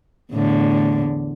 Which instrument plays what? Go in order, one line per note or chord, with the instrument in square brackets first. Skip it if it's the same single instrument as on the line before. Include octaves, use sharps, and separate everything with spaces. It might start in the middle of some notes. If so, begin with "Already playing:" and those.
[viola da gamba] E2 A2 D3